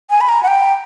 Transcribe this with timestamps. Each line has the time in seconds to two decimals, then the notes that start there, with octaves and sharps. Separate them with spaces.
0.10 G#5
0.21 B5
0.29 A#5
0.43 F#5
0.48 G5